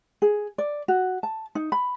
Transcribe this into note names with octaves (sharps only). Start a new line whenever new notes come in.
G#4
D5
F#4
A5
D#4
B5